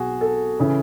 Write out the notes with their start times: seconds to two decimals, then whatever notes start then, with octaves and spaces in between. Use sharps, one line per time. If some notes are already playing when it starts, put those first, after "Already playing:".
Already playing: B1 B2 B3 F#4 G#4
0.21 A4
0.60 C#3 E3